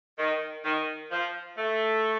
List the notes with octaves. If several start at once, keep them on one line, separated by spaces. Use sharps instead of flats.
D#3
D#3
F3
A3